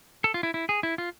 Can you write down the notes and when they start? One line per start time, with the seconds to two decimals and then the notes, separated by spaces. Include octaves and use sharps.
0.24 A4
0.34 F4
0.43 E4
0.54 E4
0.69 G#4
0.83 E4
0.98 F4